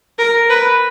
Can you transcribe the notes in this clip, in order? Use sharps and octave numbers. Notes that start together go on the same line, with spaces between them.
A#4
B4